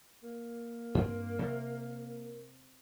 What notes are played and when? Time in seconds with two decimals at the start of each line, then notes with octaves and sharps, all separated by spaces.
0.23 A#3
0.95 G2 C4
1.39 C3 A#4